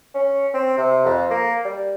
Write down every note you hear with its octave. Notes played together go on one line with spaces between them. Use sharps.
C#4
C4
C3
F2
A#3
G3